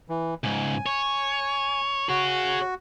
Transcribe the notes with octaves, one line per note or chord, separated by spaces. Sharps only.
E3
C#2 G#2 G#5
C#5
F#4 G#4 C#5